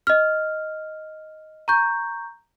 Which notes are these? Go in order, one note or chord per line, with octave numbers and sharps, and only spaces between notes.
D#5 F6
A#5 C#6 G6